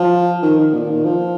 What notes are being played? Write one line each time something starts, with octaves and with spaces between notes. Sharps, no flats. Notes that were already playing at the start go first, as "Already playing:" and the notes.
Already playing: F3
D#3
D#3
A#2
D#3
F3